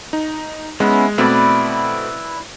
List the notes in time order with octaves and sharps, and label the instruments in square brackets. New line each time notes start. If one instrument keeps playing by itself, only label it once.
[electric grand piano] D#4
[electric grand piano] G#3 [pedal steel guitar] B3 C#4 E4
[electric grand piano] B2 A3 C4 [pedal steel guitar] E4 B4 D5